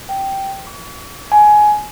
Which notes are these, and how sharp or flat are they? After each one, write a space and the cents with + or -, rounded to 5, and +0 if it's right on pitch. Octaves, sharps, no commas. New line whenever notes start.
G5 -10
C#6 +45
G#5 +15